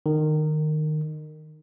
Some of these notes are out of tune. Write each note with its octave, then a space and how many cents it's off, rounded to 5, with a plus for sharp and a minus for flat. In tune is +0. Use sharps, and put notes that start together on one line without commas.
D#3 -20